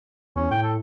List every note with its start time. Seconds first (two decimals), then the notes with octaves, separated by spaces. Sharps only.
0.36 E2 C#4
0.51 A2 G5
0.63 A4